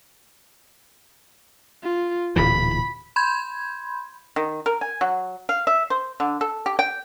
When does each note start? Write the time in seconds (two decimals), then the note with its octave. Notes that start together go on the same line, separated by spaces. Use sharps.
1.83 F4
2.36 D1 A#2 E3 B5
3.16 B5 C6 G6 G#6
4.36 D#3
4.66 A#4
4.81 G#5
5.01 F#3
5.49 F5
5.67 E5
5.90 C5
6.20 D3
6.41 A4
6.66 G4
6.79 G5